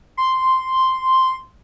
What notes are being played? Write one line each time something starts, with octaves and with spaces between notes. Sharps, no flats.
C6